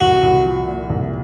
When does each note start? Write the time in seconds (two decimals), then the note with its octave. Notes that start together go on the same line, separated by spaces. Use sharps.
0.01 C2 F#4
0.23 C2
0.45 F3
0.68 A#2
0.90 C2